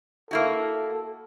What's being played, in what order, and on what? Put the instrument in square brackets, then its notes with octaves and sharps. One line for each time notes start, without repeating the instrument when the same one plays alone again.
[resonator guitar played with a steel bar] A#3 E4 F#4 [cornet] A4